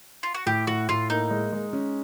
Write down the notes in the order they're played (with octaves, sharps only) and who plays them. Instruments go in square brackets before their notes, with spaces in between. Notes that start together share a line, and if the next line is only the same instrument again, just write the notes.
[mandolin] F4
F#4
[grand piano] A2 [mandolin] G4
[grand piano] A2 [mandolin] F#4
[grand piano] A2 [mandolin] F4
[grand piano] A#3 [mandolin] D#4
[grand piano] G#3
G#3
C#4